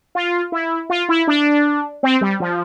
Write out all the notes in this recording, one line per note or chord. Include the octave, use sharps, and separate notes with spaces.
F4
E4
F4
E4
D4
C4
G3
F3